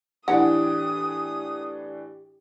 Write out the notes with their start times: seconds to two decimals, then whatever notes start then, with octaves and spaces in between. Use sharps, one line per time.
0.28 A2 E3 D4 G4 F#5 D#6